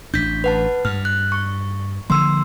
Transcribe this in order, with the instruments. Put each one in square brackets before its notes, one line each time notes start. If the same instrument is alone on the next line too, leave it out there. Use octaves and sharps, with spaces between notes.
[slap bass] A1 D4 [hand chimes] G6 B6
[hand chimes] B4 F#5 A5
[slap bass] G2 [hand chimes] F6
[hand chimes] F#6
C#6
[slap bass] D3 F3 A#3 [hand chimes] C6 E6